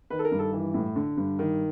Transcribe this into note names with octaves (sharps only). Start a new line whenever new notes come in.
D#3 B4
A4
A#4
G2
A4
E3
A2
D3
G2
D#3